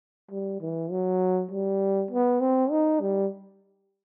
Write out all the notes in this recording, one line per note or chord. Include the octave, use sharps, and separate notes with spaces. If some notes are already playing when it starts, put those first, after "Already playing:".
G3
E3
F#3
G3
B3
C4
D#4
G3